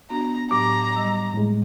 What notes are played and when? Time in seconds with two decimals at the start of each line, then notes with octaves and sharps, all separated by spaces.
0.10 B3 D4 F#4 A#5
0.51 A2 F#3 G4 A#5 D6
0.96 G3 D#5 E6
1.33 A2 G#3